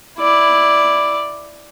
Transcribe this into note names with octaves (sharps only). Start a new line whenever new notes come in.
E4 D5